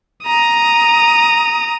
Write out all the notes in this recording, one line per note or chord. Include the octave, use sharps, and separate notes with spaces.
A#5 D#6